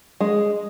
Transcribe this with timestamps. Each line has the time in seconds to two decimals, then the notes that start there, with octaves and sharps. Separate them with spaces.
0.20 G#3